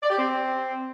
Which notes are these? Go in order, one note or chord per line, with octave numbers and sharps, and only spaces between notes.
D5
G4
C4